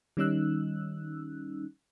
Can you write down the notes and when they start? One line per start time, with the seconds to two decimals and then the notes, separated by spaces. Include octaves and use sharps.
0.17 D#3 G3 C#4 D#4 E6 F#6